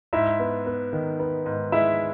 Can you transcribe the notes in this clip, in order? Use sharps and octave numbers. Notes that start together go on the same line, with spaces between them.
G#2 E4 E5
B3
B3
D#3
B3
G#2
G#3 E4 E5